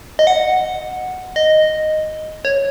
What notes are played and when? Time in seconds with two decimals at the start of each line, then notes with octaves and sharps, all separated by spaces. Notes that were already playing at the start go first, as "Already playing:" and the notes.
0.19 D#5
0.27 F#5
1.36 D#5
2.45 C#5